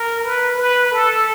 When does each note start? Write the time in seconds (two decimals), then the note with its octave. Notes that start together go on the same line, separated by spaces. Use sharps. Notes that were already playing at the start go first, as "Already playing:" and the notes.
Already playing: A#4
0.24 B4
0.58 B4
0.91 A4